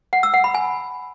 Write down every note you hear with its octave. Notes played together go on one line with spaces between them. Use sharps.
F#5
E6
F#5
B5
G#5